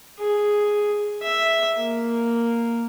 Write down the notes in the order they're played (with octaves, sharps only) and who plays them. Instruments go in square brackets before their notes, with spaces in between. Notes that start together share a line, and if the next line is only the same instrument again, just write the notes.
[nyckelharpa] G#4
E5
A#3